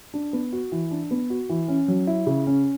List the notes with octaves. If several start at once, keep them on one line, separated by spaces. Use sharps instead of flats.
D4
B3
F#4
E3
D4
B3
F#4
E3
C#4
F#3
E4
C#3
C#4